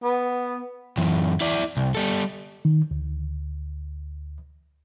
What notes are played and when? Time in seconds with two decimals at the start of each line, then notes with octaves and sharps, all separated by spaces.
0.03 B3
0.97 F#2 E3
1.41 E4 D5
1.77 C2
1.95 G3 A4
2.65 D#3
2.91 D2